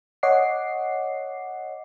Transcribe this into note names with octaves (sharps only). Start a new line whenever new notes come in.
C#5 D#5 F#5 D6 C7